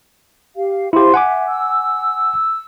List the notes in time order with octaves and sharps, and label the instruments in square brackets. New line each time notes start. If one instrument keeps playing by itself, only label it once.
[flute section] G4 F5
[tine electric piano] E4 G4 [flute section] C5 F5 C6
[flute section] E5 [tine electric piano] F#5 G#5 D6
[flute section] E6